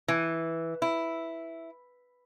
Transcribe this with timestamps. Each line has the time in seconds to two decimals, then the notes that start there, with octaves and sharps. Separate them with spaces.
0.08 E3
0.82 E4